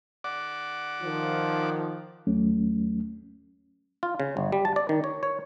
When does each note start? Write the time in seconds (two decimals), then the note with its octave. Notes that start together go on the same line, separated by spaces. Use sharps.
0.24 D5 F#5 D6
1.02 D#3 F3
2.27 D#2 F#3 A3 C#4
4.03 F4
4.20 C#3
4.37 G1
4.52 G3
4.65 A5
4.76 D5
4.89 D#3
5.04 C#5
5.23 C#5